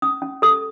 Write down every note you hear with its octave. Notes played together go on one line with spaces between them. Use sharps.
C#4 D#6
C#4
A4 D#6